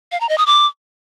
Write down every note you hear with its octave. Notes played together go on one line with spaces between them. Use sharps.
F5
A#5
D#5
D#6
D6